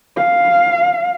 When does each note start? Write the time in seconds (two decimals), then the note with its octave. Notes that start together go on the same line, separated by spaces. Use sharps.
0.17 F5